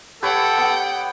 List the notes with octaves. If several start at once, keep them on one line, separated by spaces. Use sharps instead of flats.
G4 A4 B4 C#5 F#5 G5
B3